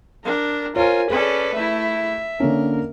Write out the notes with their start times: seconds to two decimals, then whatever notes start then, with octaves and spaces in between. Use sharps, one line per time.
0.25 D4 A#4
0.76 F4 A#4 C5 C#5 G#5
1.10 C#4 G#4 A4 B4 D5
1.55 A3 E4 E5
2.40 D3 A#3 C#4 A#4